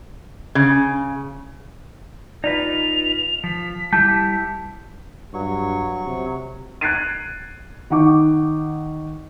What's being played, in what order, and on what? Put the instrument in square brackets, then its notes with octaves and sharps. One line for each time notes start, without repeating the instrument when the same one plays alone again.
[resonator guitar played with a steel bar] C#3
[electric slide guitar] D#4 F4 B4 [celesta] D5 [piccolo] F7
[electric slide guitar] F3 [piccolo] B6
[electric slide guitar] G3 E4 G4 [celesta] A5 G6
[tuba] G2 [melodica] F#3 C#6
[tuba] C3
[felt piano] F#6 G#6 A6 C7 D7 D#7
D#3 D#4 F#5 C#6 D6